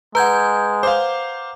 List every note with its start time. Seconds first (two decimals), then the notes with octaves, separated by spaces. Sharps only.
0.15 G#3 B4 F#5 A#5 G6 G#6
0.83 C5 F5 D6